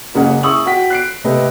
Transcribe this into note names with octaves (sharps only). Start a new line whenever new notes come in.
F#1 C#3 G#3 A#3 C#4 F#5
E4 G#4 C#6 D#6 E6 F#7
F#4 F#5 G5 B6
F#6 C7 D7
C3 A3 C4 G4 B4 D#5